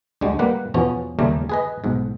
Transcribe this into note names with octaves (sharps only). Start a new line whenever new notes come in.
D2 D3 G3 G#3
G3 A#3 A#4 B4 F#5
E2 B2 F3 B3 C#4
D#2 C#3 G3 A3 A#4
G#4 B4 D#5
B1 G#2